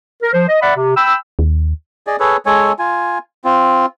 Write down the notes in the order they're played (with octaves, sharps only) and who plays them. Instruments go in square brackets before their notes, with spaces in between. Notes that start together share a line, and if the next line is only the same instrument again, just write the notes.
[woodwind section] A#4
F3 C5
D#5
D5 E5 F#5 B5
C3
G5 B5 E6
[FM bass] D#2
[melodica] G#4 D5 D#5
G#4 A4 B4 C#5
G#3 A4 C#5 G#5
F4 G#5
C4 F4